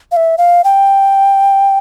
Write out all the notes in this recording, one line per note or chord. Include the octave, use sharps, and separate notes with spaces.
F5
E5
F5
G5